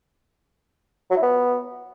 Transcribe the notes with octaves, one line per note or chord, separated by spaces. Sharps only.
F#3
E4
B3